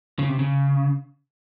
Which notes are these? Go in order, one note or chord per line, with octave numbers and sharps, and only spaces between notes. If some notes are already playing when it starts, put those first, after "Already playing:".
C#3
C3
C#3